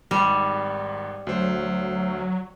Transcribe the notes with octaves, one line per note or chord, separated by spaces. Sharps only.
G#1 G#2 G3
D2 F#3 C5